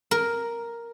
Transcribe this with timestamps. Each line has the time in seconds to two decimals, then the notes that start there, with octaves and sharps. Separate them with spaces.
0.11 A#4